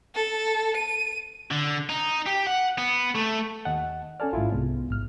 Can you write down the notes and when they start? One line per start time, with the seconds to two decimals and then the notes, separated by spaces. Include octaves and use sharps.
0.15 A4
0.77 D#7
1.51 D3
1.89 D#4
2.26 G4
2.47 F#5
2.78 B3
3.16 A3
3.65 D#2 D#5 F#5 A5
4.20 C#4 A4 D5 G#5 A5 F6
4.33 A1 G#2 E4 F4
4.52 C2 C3 G#3 B3
4.89 A1 G#2 F6